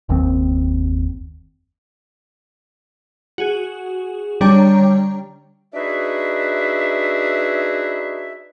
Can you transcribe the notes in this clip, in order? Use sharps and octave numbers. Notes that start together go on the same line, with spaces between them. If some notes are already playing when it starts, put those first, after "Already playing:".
F#1 D#2 D#3 C4
F#4 G#4
D3 G3 D4 C#5 G5 A#5
D4 D#4 F#4 G#4 B4 E5